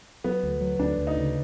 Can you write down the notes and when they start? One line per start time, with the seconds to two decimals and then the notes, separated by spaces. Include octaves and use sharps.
0.24 F#3 B3
0.43 D2
0.61 F#3
0.79 D2 D4
0.98 D2
1.07 D#4
1.17 C#3